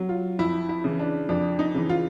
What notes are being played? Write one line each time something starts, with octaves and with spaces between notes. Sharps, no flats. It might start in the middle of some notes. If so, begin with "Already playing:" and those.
Already playing: F#3
F4
F2 E4
E4
C#3 E3
D4
F2 D4
D#4
C#3 E3
F4